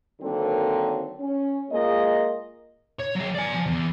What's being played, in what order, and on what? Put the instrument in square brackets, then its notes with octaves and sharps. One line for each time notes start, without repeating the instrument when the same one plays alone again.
[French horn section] D3 D#3 F#3 A#3 C4
C#4
G#3 A#3 F4 A#4 D#5
[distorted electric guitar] C#5
F#3 G#4
D5 G#5
F3
E2